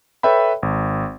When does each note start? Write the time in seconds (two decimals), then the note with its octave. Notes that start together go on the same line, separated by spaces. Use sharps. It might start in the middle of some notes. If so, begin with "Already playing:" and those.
0.23 A4 B4 C#5 E5 G5 B5
0.63 G#1